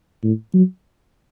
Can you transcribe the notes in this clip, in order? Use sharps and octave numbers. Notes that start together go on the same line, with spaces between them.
A2
F#3